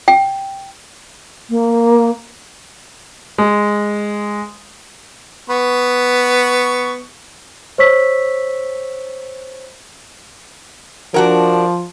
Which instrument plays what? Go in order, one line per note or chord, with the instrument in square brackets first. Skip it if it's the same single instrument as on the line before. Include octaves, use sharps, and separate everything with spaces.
[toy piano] G5
[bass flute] A#3
[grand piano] G#3
[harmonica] B3 C#6
[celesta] C5 C#5 C#6 E6 B6
[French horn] F3 [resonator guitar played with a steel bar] D4 F#4 A#4